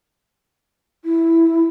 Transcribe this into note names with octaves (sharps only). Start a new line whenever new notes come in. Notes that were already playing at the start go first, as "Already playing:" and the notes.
E4